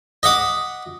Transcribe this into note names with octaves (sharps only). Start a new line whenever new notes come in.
D#5 E5 F#5 D6 D#6